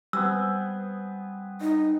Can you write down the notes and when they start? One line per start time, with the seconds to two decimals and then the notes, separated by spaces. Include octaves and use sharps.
0.13 G3 B3 C4 G#4 E6
1.61 D#4 D#5